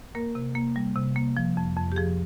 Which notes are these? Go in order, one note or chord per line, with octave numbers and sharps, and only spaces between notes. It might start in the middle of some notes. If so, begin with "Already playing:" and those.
A#3 A#4
C3
A#3
G3
C3
A#3
F3
F2
F2
G4
F3 G#4